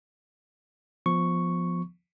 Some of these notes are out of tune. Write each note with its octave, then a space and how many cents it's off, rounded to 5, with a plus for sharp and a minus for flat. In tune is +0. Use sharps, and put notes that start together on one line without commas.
F3 +0 B3 +0 C#6 +0